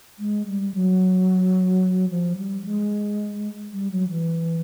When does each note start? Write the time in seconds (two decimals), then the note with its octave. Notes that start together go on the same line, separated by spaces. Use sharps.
0.19 G#3
0.46 G3
0.74 F#3
2.10 F3
2.37 G3
2.65 G#3
3.73 G3
3.91 F#3
4.09 E3